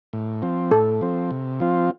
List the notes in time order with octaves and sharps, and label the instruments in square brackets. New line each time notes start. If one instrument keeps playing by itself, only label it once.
[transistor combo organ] A2
F3 C4
[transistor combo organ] A2 [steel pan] A4
[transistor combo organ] F3 C4
C3
F3 C4 F4